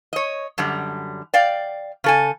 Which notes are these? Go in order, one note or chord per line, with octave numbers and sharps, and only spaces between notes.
C#5 D#5
F#2 D3 G3
D5 F5 G5
C#3 A4 G#5